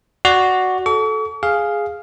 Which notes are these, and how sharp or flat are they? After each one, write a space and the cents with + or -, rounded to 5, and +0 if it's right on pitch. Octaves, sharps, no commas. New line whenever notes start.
F#4 +0 D5 +0
A4 -15 C#6 +45
G#4 +0 F5 +0